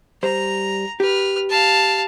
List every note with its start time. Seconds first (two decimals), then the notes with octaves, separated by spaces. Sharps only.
0.23 G3 C5 A#5
1.00 G4 B4 F6
1.50 F5 A5